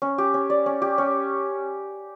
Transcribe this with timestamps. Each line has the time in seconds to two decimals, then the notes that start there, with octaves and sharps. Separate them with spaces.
0.02 C#4
0.18 G4
0.34 C#4
0.50 D5
0.66 C#4
0.82 G4
0.98 C#4